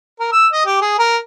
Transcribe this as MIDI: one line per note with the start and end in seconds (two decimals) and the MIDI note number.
0.20 0.31 70
0.33 0.47 88
0.52 0.64 75
0.65 0.81 67
0.81 0.97 68
0.99 1.17 70